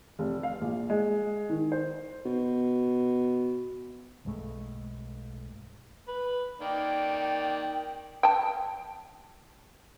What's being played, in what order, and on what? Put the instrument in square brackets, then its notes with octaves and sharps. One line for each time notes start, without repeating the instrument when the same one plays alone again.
[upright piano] F1
F5
A#1
G#3
D#3
C5
[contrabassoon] B2
[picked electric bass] B1 G2 G#3 A3
[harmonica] B4
[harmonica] D#3 A#3 D5 [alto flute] G5
[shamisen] G5 A5